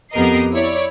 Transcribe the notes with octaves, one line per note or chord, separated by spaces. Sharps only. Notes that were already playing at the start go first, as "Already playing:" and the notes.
F2 B3 G4 A#4 D#5 C7
E4 C#5 D5